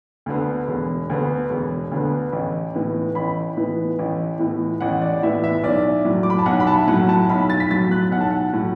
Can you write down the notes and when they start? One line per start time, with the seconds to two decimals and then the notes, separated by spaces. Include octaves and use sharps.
0.26 D2 D3 B3
0.68 E1
1.10 D2 D3 B3
1.50 E1
1.91 D2 D3 B3
2.33 A1
2.74 A2 E3 B3
3.15 A1 B5
3.57 A2 E3 B3
3.99 A1
4.39 A2 E3 B3
4.80 A1 F#5
5.02 D5
5.23 A2 E3 B3 E5
5.44 E5
5.63 B1 D5
6.05 A2 F#3
6.23 D6
6.30 B5
6.38 A5
6.46 B1 F#5
6.60 B5
6.67 A5
6.77 E5
6.87 A2 F#3 F#5
7.09 A5
7.29 B1 B5
7.50 A6
7.60 B6
7.70 A2 F#3 A6
7.91 F#6
8.12 B1 F#5
8.21 A5
8.31 F#5
8.53 A2 F#3